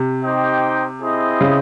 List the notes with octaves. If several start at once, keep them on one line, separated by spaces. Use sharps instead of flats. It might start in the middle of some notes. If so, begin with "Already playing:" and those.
Already playing: C3
D#4 G4 C5 D#5 G5
C4 E4 G#4 C5 D#5
C#3